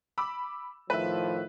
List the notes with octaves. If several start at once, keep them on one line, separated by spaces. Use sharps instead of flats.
B5 D6 E6
A2 D#3 F3 B4 E5